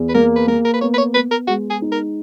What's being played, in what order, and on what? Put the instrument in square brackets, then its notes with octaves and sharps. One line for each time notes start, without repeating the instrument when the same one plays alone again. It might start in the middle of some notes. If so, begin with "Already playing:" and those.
Already playing: [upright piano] E2
[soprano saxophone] B4
[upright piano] A#3 [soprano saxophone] A#4
[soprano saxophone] B4
[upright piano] A#3 [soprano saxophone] A#4
[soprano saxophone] A#4
B4
[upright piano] B3 [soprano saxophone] C#5
[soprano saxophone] B4
C#5
[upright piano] B3 [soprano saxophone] B4
[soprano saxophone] A#4
[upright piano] G#3 [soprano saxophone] F#4
[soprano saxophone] G#4
[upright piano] D#4
[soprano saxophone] A#4